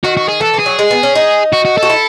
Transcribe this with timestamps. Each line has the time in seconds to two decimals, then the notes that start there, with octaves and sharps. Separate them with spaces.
0.04 D#3 F#4
0.17 F#4
0.29 G#4
0.41 E3 A4
0.54 E3
0.59 G#4
0.66 F#3
0.79 G#3
0.91 B3
1.03 C#4
1.15 D#4
1.53 F#4
1.65 F#4
1.78 F#4 A4
1.90 E4